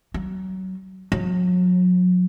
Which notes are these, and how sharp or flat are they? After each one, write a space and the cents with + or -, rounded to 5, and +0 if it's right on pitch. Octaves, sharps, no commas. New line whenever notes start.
F#3 +25
F#3 -35